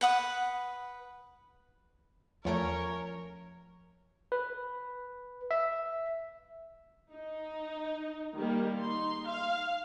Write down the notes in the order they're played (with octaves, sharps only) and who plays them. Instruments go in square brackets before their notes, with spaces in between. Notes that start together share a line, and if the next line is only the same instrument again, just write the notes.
[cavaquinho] B4 F#5 D#6
[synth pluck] E2 A3 D7 [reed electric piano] F3 [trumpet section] C#4 C#5 [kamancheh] A#4
[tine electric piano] B4
E5
[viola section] D#4
D#3 G3 A#3
D#4 C6
F5